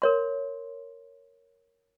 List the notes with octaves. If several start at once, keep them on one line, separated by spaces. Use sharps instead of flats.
A#4 C#5 C6